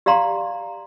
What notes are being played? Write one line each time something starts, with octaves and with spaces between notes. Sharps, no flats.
G4 D5 F5 A#5 C6